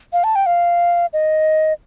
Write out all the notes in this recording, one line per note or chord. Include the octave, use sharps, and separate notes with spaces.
F5
A5
G5
F5
D#5